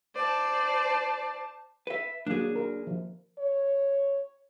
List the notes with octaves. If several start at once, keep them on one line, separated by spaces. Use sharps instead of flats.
C5 D5 A5
B4 E5
F#3 A#3 D4 G#4
A#4
F3
C#5